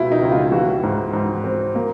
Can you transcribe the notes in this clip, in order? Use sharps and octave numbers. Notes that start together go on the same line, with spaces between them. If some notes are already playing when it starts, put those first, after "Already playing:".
Already playing: C#2 B2 E4 F4
D#4
C#2
F4
E3 F#4
G#2
G#2
C4
A#3